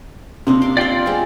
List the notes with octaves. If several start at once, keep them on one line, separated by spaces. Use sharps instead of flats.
C3 A#3 D4 D#4
C6 D6
F4 D5 F5 G5 C6
G#3 C4